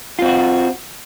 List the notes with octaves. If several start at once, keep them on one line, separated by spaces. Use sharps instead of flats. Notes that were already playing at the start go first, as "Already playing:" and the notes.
C4 F4 F#4